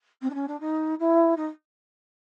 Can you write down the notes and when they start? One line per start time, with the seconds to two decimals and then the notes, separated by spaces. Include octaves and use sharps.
0.22 C4
0.29 D4
0.34 C#4
0.47 D4
0.60 D#4
0.99 E4
1.36 D#4